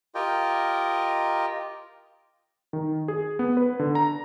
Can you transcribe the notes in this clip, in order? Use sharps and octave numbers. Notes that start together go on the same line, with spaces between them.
F4 G4 A#4 D#5 G5
D#3
G#4
B3
B4
D3
A#5